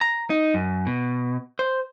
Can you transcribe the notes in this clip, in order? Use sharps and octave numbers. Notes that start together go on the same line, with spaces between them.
A#5
D#4
F#2
B2
C5